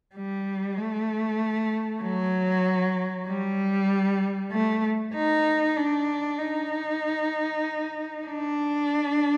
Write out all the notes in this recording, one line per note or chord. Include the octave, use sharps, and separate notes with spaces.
G3
A3
F#3
G3
A3
D#4
D4
D#4
D4